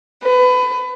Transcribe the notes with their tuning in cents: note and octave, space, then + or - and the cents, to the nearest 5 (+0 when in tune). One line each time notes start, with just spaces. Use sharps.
B4 +25